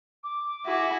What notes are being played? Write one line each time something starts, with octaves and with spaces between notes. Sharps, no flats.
D6
E4 F#4 G#4